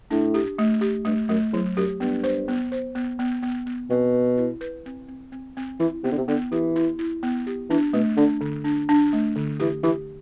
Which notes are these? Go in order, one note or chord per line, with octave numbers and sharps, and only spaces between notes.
A2 D4
G4
A3
G4
G2 A3
F#2 A3
E2 F#3
F#2 G4
G2 B3
C5
B3
C5
B3
B3
B3
B3
B2 C4
B4
E4
B4
C4
C4
C4
C4
E3 E4
C3 B3
D3
C3
D3 B3
E3 G4
E4
E4
B3
G4
E3 D4
B2 A3
D3 D4
D3
D4
D4
A3
D3
E3 G4
E3 G4